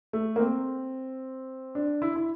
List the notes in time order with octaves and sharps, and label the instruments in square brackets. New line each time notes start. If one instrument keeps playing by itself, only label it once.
[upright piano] A3
A#3
C4
D4
E4
E4